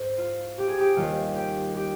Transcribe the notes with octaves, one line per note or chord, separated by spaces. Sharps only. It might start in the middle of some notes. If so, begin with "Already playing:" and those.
Already playing: G#2 C5
F4
G4
G#4
G4
D#2 D#3 G3 F4
G4
G4